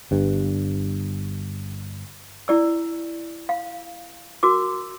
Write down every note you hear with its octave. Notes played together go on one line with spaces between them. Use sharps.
G1 G2
E4 D5 E6
F5
F#4 A#4 D6